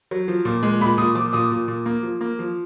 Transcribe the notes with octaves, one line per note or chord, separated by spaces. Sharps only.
F#3
F3
A#2
G#3
A#2 B5
A#2 D#6
F3 D6
A#2 D#6
A#2
A#2
A#3
F3
A#3
F3